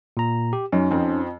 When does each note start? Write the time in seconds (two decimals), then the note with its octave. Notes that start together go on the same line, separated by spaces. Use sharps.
0.17 A#2 A#5
0.53 G4
0.72 F#2 C#4 D#4
0.91 F2 F3 C4